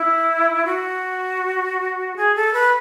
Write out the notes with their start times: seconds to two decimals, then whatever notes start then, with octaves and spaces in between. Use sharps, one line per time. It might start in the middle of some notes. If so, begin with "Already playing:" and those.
Already playing: E4
0.65 F#4
2.16 G#4
2.36 A4
2.54 B4